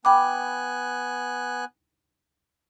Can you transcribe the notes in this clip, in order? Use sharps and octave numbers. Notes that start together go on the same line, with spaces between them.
B3 G5 G#5 B5 D6 F#6